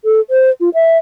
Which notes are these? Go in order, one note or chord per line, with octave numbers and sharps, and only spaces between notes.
A4
C5
F4
E5